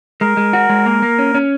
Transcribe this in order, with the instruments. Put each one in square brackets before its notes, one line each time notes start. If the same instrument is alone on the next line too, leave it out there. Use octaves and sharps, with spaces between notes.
[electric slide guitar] G#3 [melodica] A#4
[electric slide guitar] G#3
F#4
G#3
A#3
A#3
C#4
C#4